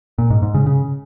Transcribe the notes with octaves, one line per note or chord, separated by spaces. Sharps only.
A#2
G#2
G#2
C#3
C#3